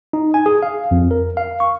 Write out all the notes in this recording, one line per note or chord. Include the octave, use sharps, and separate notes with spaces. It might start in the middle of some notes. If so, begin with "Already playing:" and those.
D#4
G#5
G#4
F5
F2
A#4
F5
C#6